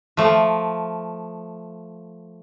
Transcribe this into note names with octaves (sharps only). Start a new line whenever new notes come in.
F3 A3